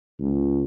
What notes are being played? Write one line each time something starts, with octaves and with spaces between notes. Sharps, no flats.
C#2